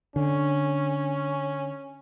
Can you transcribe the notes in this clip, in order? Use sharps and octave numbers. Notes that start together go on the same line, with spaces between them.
D3 C#4